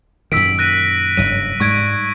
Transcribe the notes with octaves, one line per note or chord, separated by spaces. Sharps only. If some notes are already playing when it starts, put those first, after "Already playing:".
F#2 A#2 D#3 E6 B6 D7
F#6 A#6 D#7
F#1 G2 F#3 D#7
G#2 G3 C#6 G#6 D7